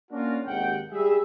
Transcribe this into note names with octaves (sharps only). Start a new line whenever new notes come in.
A#3 C#4 D4 F4 F#4 A#4
G#1 D#2 C3 F#5 G5
G3 G#4 E5